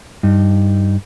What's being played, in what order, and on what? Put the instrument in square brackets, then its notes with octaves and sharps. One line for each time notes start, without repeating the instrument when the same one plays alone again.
[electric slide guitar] G2 D#4